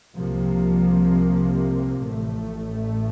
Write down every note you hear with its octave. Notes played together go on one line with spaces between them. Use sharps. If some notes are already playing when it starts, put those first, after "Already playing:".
C2 C3 F3 A#3
A1 A2 A3